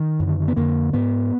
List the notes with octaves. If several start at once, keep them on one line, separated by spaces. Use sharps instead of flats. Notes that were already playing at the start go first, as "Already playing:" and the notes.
Already playing: D#3
F#2 D3
B3
F2 D3 A#3
G#2 B3